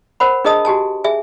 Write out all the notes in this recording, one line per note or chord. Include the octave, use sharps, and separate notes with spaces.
A#4 C5 F#5 B5
D4 G#4 A#4 D#5 A5 D#6
F#4 G4 G#5 A5
G#4 E5 G#5